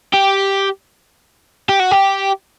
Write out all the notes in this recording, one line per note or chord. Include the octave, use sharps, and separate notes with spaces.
G4
G4
F#4
G4